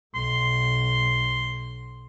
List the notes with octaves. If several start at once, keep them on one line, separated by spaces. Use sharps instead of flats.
B1 C6